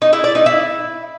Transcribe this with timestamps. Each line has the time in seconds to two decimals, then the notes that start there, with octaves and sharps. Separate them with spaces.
0.02 D#4
0.13 E4
0.24 D5
0.35 D#4
0.46 E4